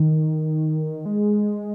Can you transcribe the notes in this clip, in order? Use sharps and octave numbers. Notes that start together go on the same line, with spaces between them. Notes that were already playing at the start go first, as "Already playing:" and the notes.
Already playing: D#3
G#3